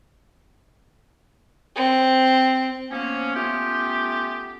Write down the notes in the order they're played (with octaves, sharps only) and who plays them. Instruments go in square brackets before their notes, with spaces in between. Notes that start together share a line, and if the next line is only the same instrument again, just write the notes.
[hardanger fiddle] C4
[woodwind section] F3 A#3 B3 C#4
A3 B3 C#4 F4 G4